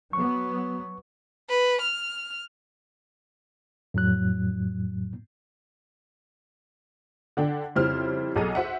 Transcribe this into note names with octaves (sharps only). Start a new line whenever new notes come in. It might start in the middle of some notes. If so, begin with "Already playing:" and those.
F#3 B3 C#6
B4
F6
F2 A2 F#3 F#6
D3 D4 G5
F2 C#3 G3 C4 E4 F6
B1 G#4 A4 A#5 D#7
F#4 C5 E5 F#5